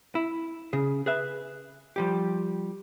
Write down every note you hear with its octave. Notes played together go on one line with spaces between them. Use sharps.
E4
C#3 G#4
G#4 B4 E5
F3 G3 G4